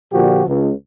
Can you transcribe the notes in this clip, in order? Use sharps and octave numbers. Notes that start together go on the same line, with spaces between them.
A#2 D3 F3 F#4 G4
C#2